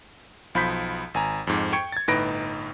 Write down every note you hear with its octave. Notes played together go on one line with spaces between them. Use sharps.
B1 F3 B5 C6 G6 B6
G#1 G#5 A#5
F2 G#2
G5 C#6 G#6 C#7
G#6 A6
G1 A2 D#4 B4 A#6 D7